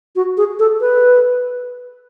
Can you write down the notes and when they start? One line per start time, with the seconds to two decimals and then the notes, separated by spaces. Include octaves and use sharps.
0.16 F#4
0.37 G#4
0.59 A4
0.81 B4